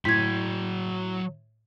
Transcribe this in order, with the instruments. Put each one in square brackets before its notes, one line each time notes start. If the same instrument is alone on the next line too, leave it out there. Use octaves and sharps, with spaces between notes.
[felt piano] A2 C6 [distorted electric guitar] F#3 G5 [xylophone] G#6 B6